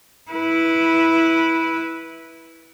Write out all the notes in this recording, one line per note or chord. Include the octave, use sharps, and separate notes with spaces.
E4 B4